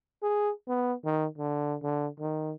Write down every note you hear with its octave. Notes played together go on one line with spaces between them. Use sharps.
G#4
B3
D#3
D3
D3
D#3